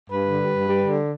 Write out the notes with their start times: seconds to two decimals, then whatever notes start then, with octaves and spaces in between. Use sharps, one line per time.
0.10 G2 B4
0.25 D3
0.39 G3
0.54 G2
0.68 G3
0.83 D3